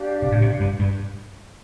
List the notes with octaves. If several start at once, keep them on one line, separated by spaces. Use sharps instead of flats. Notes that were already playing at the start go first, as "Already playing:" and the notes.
Already playing: D4 G4 D5 F5
C3
A2
C3
G2
G2